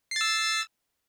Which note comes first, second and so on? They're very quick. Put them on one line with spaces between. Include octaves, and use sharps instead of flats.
C7 A6 E6